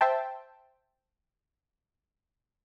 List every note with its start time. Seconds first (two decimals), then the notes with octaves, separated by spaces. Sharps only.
0.01 C5 E5 G5 A5